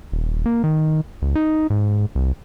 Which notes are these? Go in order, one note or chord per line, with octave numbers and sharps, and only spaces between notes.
D#1
A#3
D#3
C#2
D#4
G#2
C2